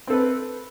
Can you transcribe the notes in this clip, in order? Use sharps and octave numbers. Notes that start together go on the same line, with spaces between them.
C4 A4 B4